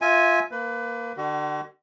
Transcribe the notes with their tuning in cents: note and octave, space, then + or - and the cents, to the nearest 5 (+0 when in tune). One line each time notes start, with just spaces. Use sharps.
F4 +0 E5 -20 G#5 +0
A#3 +0 B4 +25
D3 +35 F#4 +45